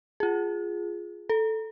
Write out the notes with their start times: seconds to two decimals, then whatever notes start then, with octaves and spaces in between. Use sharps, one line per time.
0.20 F4 G#4
1.29 A4